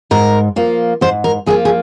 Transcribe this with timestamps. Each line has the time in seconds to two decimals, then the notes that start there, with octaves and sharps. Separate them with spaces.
0.11 G#2 A#4
0.56 F3 A#3 F4
1.01 G#2 C5
1.24 A#4
1.46 F3 A#3 F4 G#4
1.65 G#4